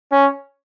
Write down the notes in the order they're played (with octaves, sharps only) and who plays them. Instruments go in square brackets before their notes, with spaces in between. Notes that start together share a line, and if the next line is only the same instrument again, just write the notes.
[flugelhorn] C#4